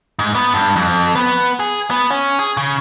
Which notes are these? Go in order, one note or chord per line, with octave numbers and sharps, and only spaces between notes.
G#2
B3
G2
F2
B3
G#4
B3
C#4
G#4
C#3